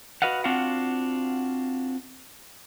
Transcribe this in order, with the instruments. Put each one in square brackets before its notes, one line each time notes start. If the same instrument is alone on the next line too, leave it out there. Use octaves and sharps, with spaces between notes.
[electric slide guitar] F#4 B4 D#5 F5 F#5
C4 D4 F4 F#4 F5 F#5